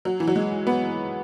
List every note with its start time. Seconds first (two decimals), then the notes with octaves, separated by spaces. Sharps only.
0.05 F#3
0.20 E3
0.28 F#3
0.36 G#3
0.67 B3